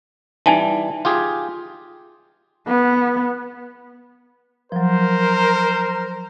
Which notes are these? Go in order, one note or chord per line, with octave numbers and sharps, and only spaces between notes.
E3 G3 D#4 G#5 A5
F4 G4 G#4
B3
F3 F#3 A#4 C5